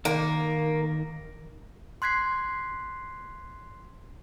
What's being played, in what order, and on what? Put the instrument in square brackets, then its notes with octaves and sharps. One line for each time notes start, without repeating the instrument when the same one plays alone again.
[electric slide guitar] D#3 [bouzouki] A#3
[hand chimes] C6 F#6 G#6 B6 C7